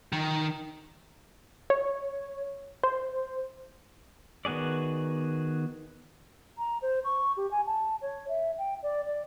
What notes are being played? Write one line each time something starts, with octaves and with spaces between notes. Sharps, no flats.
D#3
C#5
C5
D#3 B3 F#4 G#4 D5
A#5
C5
C#6
G4
G#5
A5
C#5
E5
G5
D5
D5